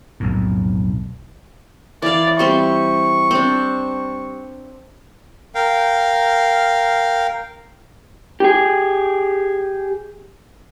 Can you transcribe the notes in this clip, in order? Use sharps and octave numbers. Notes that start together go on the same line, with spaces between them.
B1 F2 A2
E3 D5 F5
G3 C4 C6 C#6
C4 D4
A#4 F5 G5
G4 G#4